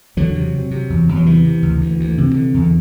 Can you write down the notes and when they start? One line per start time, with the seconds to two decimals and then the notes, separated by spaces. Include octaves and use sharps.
0.17 E2 D3 F#3
0.35 C3
0.54 C3
0.71 C3
0.90 E2
1.09 E2
1.16 F#3
1.26 C3 E3
1.44 C3
1.62 D2
1.81 D2
1.99 D2
2.18 C3
2.36 D3
2.54 E2